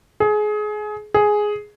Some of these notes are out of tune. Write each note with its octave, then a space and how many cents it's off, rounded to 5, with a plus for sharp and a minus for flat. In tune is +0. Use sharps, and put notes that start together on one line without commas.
G#4 +25
G#4 +5